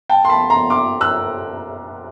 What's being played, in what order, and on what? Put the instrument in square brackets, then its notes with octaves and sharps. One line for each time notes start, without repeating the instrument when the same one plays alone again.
[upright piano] G5 A5
C6
A5 B5
A#5 C6
C6 D6
E6 F#6